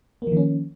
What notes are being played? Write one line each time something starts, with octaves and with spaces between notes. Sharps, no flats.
D#3 F3 A#3 C#4